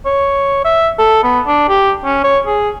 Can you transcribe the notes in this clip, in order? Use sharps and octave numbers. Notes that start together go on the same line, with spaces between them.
C#5
E5
A4
B3
D4
G4
C#4
C#5
G#4